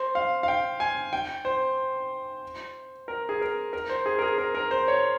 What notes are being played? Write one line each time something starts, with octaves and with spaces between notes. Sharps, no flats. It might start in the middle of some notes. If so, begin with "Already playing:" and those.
Already playing: C5
F5
F5
G5
G#5
G5
C5
A#4
G#4
A#4
A#4
C5
G#4
A#4
G#4
A#4
A#4
C5
C#5